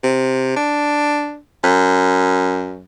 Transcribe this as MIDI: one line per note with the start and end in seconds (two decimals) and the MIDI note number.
0.04 0.53 48
0.56 1.38 62
1.64 2.85 42